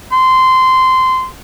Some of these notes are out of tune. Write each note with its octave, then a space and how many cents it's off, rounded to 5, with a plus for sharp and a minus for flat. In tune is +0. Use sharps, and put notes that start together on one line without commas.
C6 -15